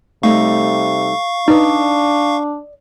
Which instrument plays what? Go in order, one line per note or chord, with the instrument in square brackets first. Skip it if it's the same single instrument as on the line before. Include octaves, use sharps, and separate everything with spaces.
[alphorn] C3 [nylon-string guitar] G3 A3 D#4 [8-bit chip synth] F5 C#6
[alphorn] D4 [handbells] D#4 B4 [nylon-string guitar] D5 D#5